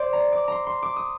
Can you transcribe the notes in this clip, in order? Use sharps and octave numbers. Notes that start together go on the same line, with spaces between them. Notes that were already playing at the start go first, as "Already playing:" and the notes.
Already playing: C5 D5
A#5
D6
A#5 C6
C6
D6
D#6